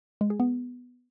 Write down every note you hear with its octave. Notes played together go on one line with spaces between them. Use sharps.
G#3
G#4
B3